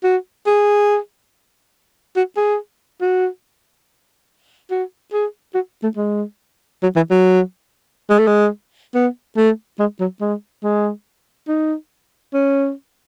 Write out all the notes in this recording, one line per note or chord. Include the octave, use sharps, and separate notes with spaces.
F#4
G#4
F#4
G#4
F#4
F#4
G#4
F#4
A3
G#3
F#3
E3
F#3
G#3
A3
G#3
B3
A3
G#3
F#3
G#3
G#3
D#4
C#4